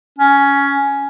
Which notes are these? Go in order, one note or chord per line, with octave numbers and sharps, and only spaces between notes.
C#4